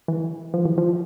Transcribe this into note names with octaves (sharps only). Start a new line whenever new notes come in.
E3
F3
E3
F3